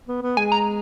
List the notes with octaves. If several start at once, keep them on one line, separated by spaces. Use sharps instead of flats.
B3
B3
G#3 G#5
A#5